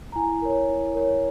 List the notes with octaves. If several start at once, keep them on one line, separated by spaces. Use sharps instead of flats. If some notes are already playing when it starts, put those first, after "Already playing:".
A#5
E4 G#5
A#4 C#5
E4
A#4 C#5